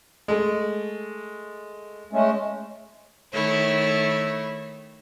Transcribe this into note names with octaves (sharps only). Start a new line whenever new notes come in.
G#3 A3
G#3 A3 C#4
D#3 A3 E4 C#5